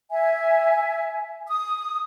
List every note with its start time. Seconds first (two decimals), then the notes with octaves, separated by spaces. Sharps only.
0.11 E5 G#5
1.47 D#6